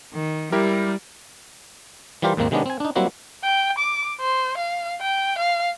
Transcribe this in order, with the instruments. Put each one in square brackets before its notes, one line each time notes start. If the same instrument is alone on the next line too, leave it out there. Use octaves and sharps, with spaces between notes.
[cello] D#3
[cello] G3 [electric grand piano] E4 G4 A#4
[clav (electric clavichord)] E3 G3 F4 G4 A#4 C5
D#2 G#2 D#3 A#3 C4
C3 D#3 G#3 B3 C#4 D4
C4 G#5
D4 D#4
F#3 G3 A#3 C4 E4 F#4
[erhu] G5
D6
C5
F5
G5
F5